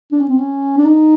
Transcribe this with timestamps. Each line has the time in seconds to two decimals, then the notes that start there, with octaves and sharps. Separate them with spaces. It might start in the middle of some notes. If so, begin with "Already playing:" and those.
0.12 D4
0.20 C#4
0.29 C4
0.38 C#4
0.78 D4
0.85 D#4